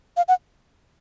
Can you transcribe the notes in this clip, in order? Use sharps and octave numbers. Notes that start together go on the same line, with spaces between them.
F5
F#5